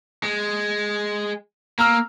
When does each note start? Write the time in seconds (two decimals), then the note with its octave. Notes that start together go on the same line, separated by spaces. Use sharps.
0.23 G#3
1.79 A#3 A#5 E6 F6